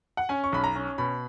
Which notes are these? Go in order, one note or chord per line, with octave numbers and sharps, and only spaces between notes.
F#5
C#4 G#5
C#6
B1 B5
A#5
C#4
B2 B5